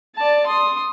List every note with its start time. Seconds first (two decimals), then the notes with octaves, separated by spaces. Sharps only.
0.16 D5 A5
0.46 C6 D#6